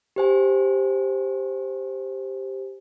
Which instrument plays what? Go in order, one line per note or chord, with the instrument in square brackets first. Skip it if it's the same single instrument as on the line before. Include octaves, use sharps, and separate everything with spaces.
[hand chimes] G4 C5 G#5